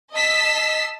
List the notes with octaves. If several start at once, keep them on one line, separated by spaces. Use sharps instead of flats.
D#5 A5 E6 B6 C7